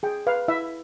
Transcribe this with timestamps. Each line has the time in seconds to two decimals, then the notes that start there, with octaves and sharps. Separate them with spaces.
0.03 G#4 G5
0.27 B4 F5
0.48 E4 E5